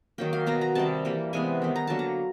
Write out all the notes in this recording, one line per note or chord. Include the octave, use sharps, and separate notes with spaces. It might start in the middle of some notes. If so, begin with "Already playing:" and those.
D#3 F#3 A#3 G5
F5
B2 F#3 B3 A#5
A#5
C3 D#3 G3 A5
E3 G3 A#3
C3 E3 G#3 B3 G#5
D#3 G3 B3
A#5
D3 F#3 A#3 A5
A#5